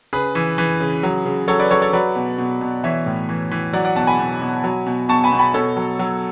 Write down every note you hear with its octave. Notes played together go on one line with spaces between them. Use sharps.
C#3 G#4 B4
E3
E3
C#3
F#3
C#3
F#3 A4 C#5
B4 D5
F#3 A4 C#5
A4 C#5
F#3 B4 D5
B2
B2
B2
E3 C#5 E5
A2
E3
E3
F#3 D5 F#5
D5 F#5
B2 F#5 A5
G#5 B5
B2
B2
F#3
B2
B2 A5 C#6
G#5 B5
B2
G#5 B5
B2 A4 C#5
F#3
F#3